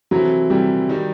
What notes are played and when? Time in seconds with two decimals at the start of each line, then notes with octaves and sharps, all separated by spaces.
0.11 C3 E3 F#3 A3 C4 E4
0.50 C3 E3 G3 A3 C4 E4
0.89 D#3 G3 D#4